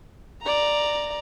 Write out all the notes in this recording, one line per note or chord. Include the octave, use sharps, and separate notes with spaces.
D5 A#5